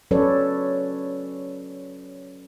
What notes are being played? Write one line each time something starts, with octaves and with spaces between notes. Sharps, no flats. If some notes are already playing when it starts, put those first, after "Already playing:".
F#3 C#4 A4 B4 C#5 D5